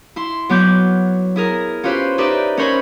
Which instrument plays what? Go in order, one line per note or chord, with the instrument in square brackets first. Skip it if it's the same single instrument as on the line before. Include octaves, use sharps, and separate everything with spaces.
[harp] E4 C6
F#3 B3 D6 G6
E4 G#4 A#4
C#4 F4 G4 B4 C5
D#4 G4 B4 D5 E5
C#4 A#4 C5 C#5 B5